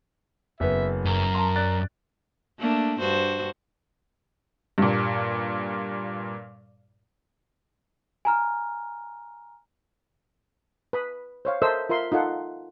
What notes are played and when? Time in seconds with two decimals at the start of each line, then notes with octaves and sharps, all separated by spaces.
0.60 F#1 B3 B4 E5
1.05 F#2 A#4
1.35 A5 A#5 C6
1.56 D5 F#6 A6
2.59 A3 A#3 D4
3.00 G2 F#4 C5
4.78 G2 A#2
8.25 G#5 A#5 F6
10.93 B4 B5 D#6
11.45 C5 C#5 F5
11.62 A4 A#4 C5 D#5 E5 E6
11.89 F4 A#4 E5 C6
12.12 D#4 F4 A4 F#5 C6